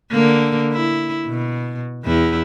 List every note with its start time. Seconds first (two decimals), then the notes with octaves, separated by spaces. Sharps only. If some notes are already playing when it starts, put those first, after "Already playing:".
0.11 D3 A#3
0.72 E4
1.27 B2
2.04 E2 E4